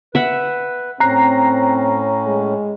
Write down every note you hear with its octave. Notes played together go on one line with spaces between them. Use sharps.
B4 E5 F#5
A2 C4 C#4 A#5 F#6 C7
G#3